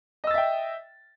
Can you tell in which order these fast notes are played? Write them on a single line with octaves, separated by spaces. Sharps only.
D#5 E6 A6 E5 G5